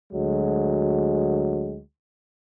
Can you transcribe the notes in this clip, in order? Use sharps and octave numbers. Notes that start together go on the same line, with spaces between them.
D2 F#3 G#3